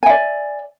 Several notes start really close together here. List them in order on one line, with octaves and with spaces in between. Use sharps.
G#5 E5 D5